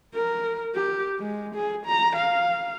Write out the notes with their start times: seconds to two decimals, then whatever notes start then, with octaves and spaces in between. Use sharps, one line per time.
0.15 A#4
0.75 G4
1.19 G#3
1.55 G#4
1.86 A#5
2.16 F5